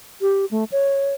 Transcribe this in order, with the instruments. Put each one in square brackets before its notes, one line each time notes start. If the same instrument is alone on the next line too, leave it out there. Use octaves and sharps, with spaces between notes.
[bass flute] G4
A3
C#5